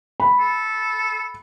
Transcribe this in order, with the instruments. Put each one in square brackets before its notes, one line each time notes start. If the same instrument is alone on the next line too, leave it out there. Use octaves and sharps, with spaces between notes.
[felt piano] B5
[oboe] A4